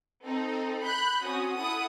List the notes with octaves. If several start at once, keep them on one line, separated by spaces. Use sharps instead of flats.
C4 D#4 A4
B5 F#6 G6
C4 C#4 F#4 D#6
E4 A4 F#5 D#6